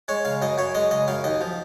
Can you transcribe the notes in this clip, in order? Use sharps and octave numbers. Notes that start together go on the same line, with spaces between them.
G#3 C#5
C#3 F5
F#2 D#5
F#2 C#5
G#3 D#5
C#3 D#5
F#2 F5
D#2 D#5
F3